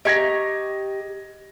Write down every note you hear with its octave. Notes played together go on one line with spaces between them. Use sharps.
G4 D#5 A#5 C#6 G#6 A#6